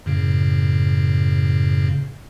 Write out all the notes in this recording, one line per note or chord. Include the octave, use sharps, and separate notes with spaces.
F#2 A2 C#3